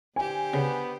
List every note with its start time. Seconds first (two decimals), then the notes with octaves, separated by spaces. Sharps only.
0.16 D3 G4 C5 G#5
0.53 C#3 B3